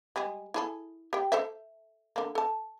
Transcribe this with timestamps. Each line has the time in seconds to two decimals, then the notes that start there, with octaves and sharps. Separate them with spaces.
0.16 G3 G#3 G#4
0.54 E4 G#4 A4
1.13 G4 G5
1.32 A4 C5 E5
2.16 D3 A#3
2.35 A4 A5